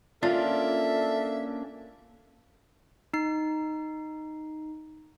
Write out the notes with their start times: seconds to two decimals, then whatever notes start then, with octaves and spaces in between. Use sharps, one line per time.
0.23 A#3 C#4 D4 F4 A4 E5
3.14 D#4 C7